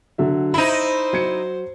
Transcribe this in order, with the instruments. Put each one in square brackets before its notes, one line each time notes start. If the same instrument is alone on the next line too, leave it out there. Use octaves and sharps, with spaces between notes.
[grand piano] D3 F#3 E5
[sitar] D#4 E4 [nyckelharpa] C5 [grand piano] E5
[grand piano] F#3 G#6 C#7